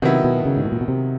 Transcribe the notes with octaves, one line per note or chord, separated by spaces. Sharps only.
C3 D#3 F#3 B3 E4
B2
C#3
G#2
A2
A#2
B2
C3